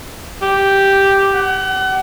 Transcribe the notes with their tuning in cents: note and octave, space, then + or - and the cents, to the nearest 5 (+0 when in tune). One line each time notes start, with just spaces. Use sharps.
G4 +0
F#5 +35